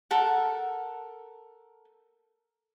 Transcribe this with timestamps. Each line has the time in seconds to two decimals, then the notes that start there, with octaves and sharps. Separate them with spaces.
0.11 A4 A#4 F#5